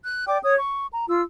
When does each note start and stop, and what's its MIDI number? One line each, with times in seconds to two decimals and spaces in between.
0.04 0.25 90
0.26 0.38 74
0.26 0.38 79
0.26 0.38 86
0.43 0.55 73
0.43 0.55 87
0.57 0.87 85
0.92 1.06 82
1.09 1.22 65
1.09 1.22 88